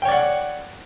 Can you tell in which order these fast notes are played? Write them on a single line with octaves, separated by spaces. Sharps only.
G5 C#5 D5 F#5